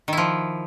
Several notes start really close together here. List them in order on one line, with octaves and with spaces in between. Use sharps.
D#3 E4 F3